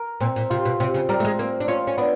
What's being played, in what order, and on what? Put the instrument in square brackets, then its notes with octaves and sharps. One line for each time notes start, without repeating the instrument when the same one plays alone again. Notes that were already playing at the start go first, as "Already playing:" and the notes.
Already playing: [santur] A#4
[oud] A#2 [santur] C4
[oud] A#2
[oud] C3 [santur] F4
[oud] B2
[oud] C3 [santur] C4
[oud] C#3
[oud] G3 [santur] A#4
[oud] A3
G#3
[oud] A#3 [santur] C4
[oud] D4
[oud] C#4 [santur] F4
[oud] C#4
[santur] B3 [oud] D4